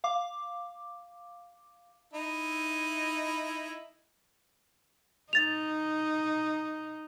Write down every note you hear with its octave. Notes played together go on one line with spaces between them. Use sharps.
F5 D6
D#4 E4
D#4 A6 F7